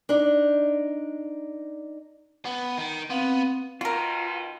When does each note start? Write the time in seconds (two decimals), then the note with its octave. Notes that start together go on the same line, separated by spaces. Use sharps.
0.09 D4 D#4
2.45 B3
2.78 D#3
3.10 B3 C4 F5
3.81 B2 D#3 F4 F#4 A#4